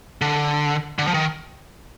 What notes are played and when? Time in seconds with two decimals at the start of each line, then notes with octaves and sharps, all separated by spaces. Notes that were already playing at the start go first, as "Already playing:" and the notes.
0.21 D3
0.99 D3
1.07 F3
1.14 D#3